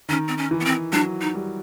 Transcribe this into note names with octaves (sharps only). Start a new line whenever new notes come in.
D#3 C#4
C4
C#4
E3
B3
C4
F#3 D4
D#4
G3